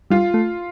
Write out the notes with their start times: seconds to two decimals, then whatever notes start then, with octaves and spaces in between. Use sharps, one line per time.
0.10 G3 F4
0.34 A3